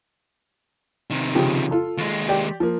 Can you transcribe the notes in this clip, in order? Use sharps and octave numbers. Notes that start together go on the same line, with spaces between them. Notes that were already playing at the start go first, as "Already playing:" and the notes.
C3 D#3
C#3 F3 G4
F4 A4
D#2 G#3
G4 D5 G5
F3 A#3